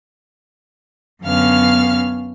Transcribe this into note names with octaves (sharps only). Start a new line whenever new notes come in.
F#2 D3 B3 C#4 F5 F6